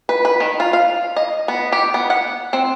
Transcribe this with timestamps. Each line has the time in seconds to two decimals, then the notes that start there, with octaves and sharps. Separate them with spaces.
0.09 B4
0.25 B4
0.40 D#3
0.60 F4
0.73 F5
1.16 D#5
1.48 B3
1.72 G4
1.94 B3
2.10 F#5
2.53 C4